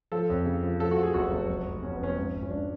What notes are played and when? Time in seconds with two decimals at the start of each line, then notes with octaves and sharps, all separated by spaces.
0.12 F3 A4
0.30 F2
0.46 C#3
0.63 F3
0.80 F3 A4
0.91 F#4
0.97 F3
1.03 G#4
1.14 F#1 F#4
1.31 F#1
1.49 F1
1.66 F1
1.83 F1 C#4
1.93 B3
2.00 F2 C#4
2.17 G#1
2.34 G#1
2.42 C#4
2.50 G#1 D4